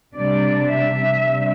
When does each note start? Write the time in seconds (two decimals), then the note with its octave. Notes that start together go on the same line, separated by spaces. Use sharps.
0.16 C3 G3 D4 D5
0.70 E5
1.24 C3 G3 D4